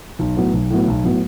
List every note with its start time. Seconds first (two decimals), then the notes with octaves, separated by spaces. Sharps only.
0.19 B1
0.36 A2 F#3 B3
0.53 B1
0.70 A2 F#3 B3
0.88 B1
1.04 A2 F#3 B3